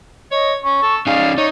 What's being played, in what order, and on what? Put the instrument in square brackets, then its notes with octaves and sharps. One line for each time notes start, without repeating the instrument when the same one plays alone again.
[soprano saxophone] C#5 [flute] D#5
[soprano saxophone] C#4 [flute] C#6
[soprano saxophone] A4
[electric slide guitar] C#4 D#4 G#4 [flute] D5 [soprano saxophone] F5
[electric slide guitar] D#4 [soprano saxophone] C#5